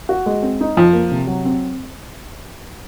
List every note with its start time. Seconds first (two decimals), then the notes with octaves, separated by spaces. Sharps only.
0.09 F#4
0.26 G#3
0.43 C4
0.61 D#4
0.77 F2 F3
0.93 A#3
1.11 C3
1.27 F#3
1.45 C4